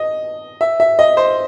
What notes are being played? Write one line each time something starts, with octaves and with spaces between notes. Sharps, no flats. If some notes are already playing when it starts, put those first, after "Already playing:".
Already playing: D#5
E5
E5
D#5
C5